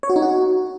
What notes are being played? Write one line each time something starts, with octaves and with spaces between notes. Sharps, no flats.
C#5
F#4
D#4
F#4